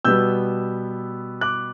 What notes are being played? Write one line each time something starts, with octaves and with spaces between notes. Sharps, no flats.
B2 G3 B3 E6 G6
D6 F#6